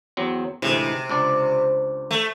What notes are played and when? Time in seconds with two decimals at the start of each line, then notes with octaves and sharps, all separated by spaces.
0.17 E2 F#3 C4
0.62 D2 G#2 C3 E3
1.09 C#2 D4 D5
2.11 A3